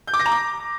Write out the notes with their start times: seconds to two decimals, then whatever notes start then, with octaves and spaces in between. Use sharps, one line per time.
0.07 G6
0.14 D6
0.20 A#6
0.26 A#5
0.32 D6